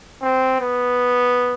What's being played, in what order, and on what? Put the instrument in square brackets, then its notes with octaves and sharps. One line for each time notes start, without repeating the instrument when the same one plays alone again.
[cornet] C4
B3